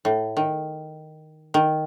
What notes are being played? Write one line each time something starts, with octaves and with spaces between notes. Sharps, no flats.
A2
D#3
D#3